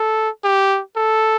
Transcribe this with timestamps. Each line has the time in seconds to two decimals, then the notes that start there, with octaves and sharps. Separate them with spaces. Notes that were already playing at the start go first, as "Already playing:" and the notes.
Already playing: A4
0.44 G4
0.97 A4